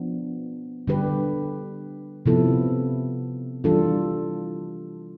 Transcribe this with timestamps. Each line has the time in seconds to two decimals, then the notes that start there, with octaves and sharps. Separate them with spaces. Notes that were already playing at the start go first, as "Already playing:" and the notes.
Already playing: F3 B3 D4
0.87 D3 G3 D4 G4 B4
2.26 C3 F3 B3 E4 A4
3.64 E3 G3 D4 F4 A4